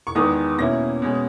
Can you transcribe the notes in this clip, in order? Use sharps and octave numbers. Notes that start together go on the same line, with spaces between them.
C#6
E2 D#3 G#3 B3 D#6
B2 A#3 C#4 E4 A#6
B2 G#3 C#4